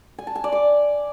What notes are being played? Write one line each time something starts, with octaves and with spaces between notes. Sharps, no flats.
G#5
A5
G#5
D5
D6